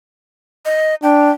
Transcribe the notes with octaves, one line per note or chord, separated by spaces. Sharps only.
D#5
D4 G5